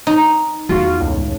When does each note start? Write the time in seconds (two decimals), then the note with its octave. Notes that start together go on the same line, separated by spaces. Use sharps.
0.07 D#4
0.69 E2 F4 F#4
1.00 C#2 A2